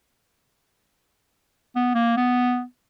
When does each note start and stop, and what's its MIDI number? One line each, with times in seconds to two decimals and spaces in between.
1.76 1.90 59
1.95 2.16 58
2.17 2.63 59